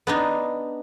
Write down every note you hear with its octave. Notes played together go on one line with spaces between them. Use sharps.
B3 D4 D#4